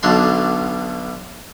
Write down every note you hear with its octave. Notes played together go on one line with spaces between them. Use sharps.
B1 B2 D3 D4 C6